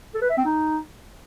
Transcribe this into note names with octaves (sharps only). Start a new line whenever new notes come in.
A4
B4
E5
C4
D#4